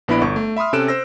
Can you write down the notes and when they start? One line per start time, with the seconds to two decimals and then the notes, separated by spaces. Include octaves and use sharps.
0.08 A#1 B3 D4 E4 B5 D7
0.21 G1 C#6
0.36 A3
0.57 E5 B5 C6 D#6 F6
0.73 C3 C#4 A4 F#6 D7 E7
0.88 C5 E6 A#6